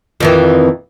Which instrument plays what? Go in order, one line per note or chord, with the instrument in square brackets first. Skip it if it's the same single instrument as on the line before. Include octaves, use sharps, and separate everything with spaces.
[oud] F2 D#3 E3